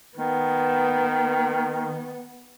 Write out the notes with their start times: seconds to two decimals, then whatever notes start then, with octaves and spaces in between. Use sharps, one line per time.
0.17 D#3 B3